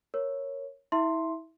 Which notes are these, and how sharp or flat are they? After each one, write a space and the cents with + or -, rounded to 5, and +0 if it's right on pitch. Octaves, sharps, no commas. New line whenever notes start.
A#4 +0 C#5 -5
E4 -35 E5 +10 C6 +5